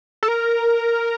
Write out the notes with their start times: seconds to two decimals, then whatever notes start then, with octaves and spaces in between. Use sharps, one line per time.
0.23 A4
0.28 A#4